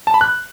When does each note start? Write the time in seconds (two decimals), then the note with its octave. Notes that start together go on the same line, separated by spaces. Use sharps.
0.07 A5
0.14 B5
0.21 F#6